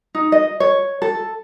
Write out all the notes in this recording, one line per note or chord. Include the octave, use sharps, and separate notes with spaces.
D#4
D#5
C#5
A4